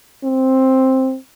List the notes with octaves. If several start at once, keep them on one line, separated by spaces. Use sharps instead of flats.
C4